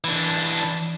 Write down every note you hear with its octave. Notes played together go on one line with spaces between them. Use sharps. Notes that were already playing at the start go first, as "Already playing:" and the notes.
E3 D4